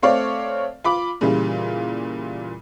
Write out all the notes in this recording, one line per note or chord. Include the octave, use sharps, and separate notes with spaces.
A3 C4 C#5 D5 F5
F4 B5 D6
A#2 C#3 E3 G3 F4